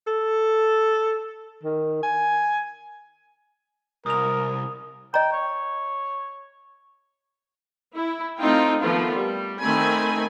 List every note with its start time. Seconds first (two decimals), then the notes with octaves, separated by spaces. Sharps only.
0.07 A4
1.63 D#3
2.03 G#5
4.06 C2 A#4 D#6 F7
5.14 D#5 G5 A#5
5.33 C#5
7.93 E4
8.39 A3 C4 D#4 F4 G5
8.81 D#3 F3 A3 B3 F4
9.14 G3
9.61 D#3 A3 C4 G#5 B5